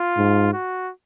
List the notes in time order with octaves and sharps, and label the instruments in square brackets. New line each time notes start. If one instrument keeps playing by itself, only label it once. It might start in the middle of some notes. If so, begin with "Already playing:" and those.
Already playing: [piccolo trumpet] F4
[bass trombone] G#2
[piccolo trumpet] F#4